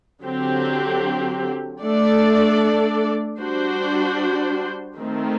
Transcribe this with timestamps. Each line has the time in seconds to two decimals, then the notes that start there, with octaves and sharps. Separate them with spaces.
0.22 D3 F#3 C4 G4
1.80 A3 D4 A4 D5
3.39 G3 D4 F#4 C5
4.98 D#3 A3 C4